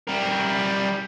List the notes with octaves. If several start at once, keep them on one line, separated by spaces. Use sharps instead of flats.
G3 A#4